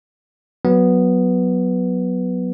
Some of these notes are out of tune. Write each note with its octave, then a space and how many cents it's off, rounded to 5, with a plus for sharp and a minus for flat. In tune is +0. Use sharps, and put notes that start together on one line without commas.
F#3 +0 B3 +0